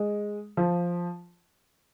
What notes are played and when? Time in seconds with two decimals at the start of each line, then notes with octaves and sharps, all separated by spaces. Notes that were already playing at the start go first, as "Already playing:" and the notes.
Already playing: G#3
0.57 F3